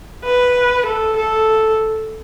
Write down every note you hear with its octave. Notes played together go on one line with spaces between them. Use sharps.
B4
A4
A4